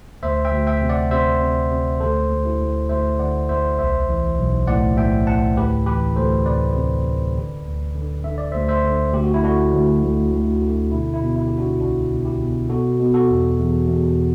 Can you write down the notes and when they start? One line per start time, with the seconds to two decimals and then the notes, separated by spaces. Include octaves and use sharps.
0.23 D2 C5 E5
0.45 E5 G5
0.52 D2
0.67 E5 G5
0.81 C3
0.89 D5 F#5
1.11 C3 C5 E5
1.41 C3
1.71 C3
2.00 D2 A4 C5
2.31 D2
2.45 E4 G4
2.60 D2
2.89 D2 C5 E5
3.19 D3 D5 F#5
3.49 D2 C5 E5
3.78 B1 C5 E5
4.09 E3
4.38 B1
4.67 A2 D5 F#5
4.97 A2 E5 G5
5.27 A2 F#5 A5
5.56 D2 G4 B4
5.86 E3 G4 B4
6.16 D2 A4 C5
6.46 C3 B4 D5
6.75 C3
7.05 D2
7.36 D3
7.65 D2
7.95 D3
8.24 D3 E5
8.38 D5
8.52 D2 C5 E5
8.69 C5 E5
8.84 D3
9.13 D2 G4
9.24 F#4
9.34 E4
9.42 D3 D4 F#4
9.73 D2
10.03 D2
10.32 D2
10.62 D3
10.91 B2 E4
11.14 E4
11.21 B2
11.36 E4
11.47 B2 G4
11.58 D4 F#4
11.80 C2 D4 F#4
12.10 B2
12.25 E4 G4
12.40 B2
12.69 B2 F#4 A4
12.99 B2
13.14 F#4 A4
13.29 E2
13.59 E2
13.88 E2